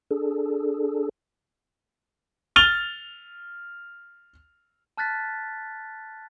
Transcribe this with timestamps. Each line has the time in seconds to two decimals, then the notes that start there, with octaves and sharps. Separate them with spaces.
0.11 D4 G#4 A4
2.56 F6 A6 F7 G7
4.97 A5 F6 F#6 A6 B6